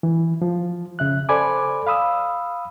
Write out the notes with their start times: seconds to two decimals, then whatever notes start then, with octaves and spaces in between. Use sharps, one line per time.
0.03 E3
0.42 F3
0.99 C#3 E5 F#6
1.29 A4 C5 D5 G#5 B5 D6
1.87 F5 B5 D#6 E6